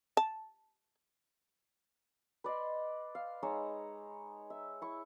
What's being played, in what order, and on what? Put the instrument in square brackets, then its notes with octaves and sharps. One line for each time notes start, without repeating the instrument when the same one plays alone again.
[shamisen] A5
[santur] B4 D5 D#5 C6
F5
G#3 D#4 C#5 E6
E5
E4 C#6